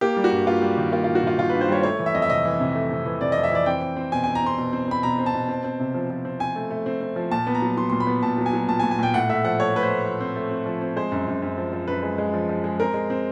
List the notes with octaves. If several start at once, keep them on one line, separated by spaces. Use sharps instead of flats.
A#3 G4
G3
F#4
G2
A#3 F4
G3
D#3
A#3 F4
F4
G2
F#4
D#3 F4
D#3 F4
B4
G2
C5
G3 C#5
A3 C#5
E3
E5
F2 D#5
E5
C3 D#5
E3
C3
A3
C3
E3
C3 D5
D#5
F2
E5
E3 D5
C4 G5
C4
C4
B2 G#5
G#5
C4
A#5
C4 C6
B2
C4
C4 B5
B2 A#5
C4
A5
B2
C4
C4
C3
F3
F3
C4
C4 G#5
A3
A3
C4
C4
F3
A#2 A5
B3
A#5
F#3
F#3 C6
A#2 C6
B5
B3
A#2 A5
F#3
G#5
F#3
A#2 A5
G#5
A#2
G#5
A#2 G5
A2 F#5
A3 E5
F3 F#5
A3 C#5
A3 B4
C5
A3
F3
C4
A3
C4
F3
C4
G#3 C5
F#2
F#2
F#2
F3
F3
F#2 B4
G#3
G#3
F3
F3
G#3
C4 A#4
G#3
C4